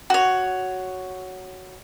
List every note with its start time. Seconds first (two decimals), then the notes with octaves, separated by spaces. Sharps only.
0.10 F#4 C#5